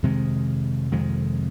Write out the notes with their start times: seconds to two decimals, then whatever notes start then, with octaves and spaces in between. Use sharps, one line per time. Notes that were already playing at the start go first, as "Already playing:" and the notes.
0.03 F2 C3 D#3 G#3
0.92 F2 C3 D#3 G#3